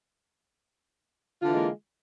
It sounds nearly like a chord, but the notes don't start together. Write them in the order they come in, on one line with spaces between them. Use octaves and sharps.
F4 D3 E3 G#3 A#3